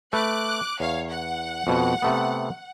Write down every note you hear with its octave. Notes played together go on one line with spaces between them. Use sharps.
A3 B4 D6 F#6
E2 C#5 F5
F#5
F2 B2
C3 A3 B3